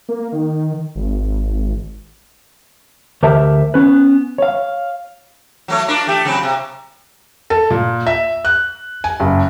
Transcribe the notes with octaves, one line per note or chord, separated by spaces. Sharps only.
A#3
D#3
G#1
D2 G4 A#4 C5 E5 A5
B3 C#4 B4
C#5 F5
F#3 A3 C#5
D4 F4 A#4
A3 G4
C#3 F#3 C4
C3
A4
A#2
E5
F#6
G#5
F#1